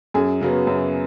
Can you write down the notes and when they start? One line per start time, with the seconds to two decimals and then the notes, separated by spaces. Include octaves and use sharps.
0.14 F#2 G#4
0.41 C#3 F#3 B3
0.67 F#2